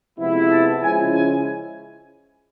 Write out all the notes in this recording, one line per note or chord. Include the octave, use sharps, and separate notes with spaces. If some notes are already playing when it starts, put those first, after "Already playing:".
C3 F3 G#3 B3 E4
A5
C#3 F3 G#3 C#4 E4 G#5
G#5